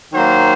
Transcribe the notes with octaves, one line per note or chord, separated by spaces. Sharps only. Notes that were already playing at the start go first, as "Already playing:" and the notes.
D#3 F#3 A#3 C5